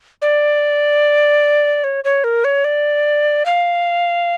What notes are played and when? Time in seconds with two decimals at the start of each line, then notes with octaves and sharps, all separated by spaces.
0.22 D5
1.84 C#5
2.04 C#5
2.24 A#4
2.44 C#5
2.64 D5
3.46 F5